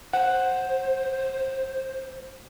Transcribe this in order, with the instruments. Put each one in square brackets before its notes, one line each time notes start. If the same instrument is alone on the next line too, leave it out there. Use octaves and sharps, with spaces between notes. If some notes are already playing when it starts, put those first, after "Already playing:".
[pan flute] C5 [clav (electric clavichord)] F#5